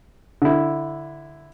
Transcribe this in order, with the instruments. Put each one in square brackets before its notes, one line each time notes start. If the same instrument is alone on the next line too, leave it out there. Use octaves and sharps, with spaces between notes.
[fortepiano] D3 E4